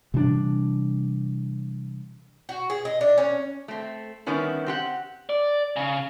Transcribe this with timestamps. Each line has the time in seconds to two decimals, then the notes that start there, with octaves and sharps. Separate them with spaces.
0.14 C3 E3 G3 D4
2.49 F#4
2.70 G#4
2.85 D#5
3.01 D4
3.18 C#4
3.68 A3 C4
4.26 D#3 G3 B3 C#4 E4
4.66 C4 G4 F#5
5.29 D5
5.76 C#3